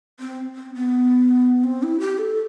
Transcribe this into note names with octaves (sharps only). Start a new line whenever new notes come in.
C4
C4
B3
C4
E4
G4
A4